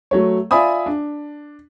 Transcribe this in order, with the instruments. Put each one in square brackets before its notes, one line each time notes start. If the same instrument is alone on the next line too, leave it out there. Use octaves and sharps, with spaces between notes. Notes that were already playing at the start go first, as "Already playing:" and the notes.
[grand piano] F#3 A3 C#5
F4 D5 E5 G#5 B5 D#6
D4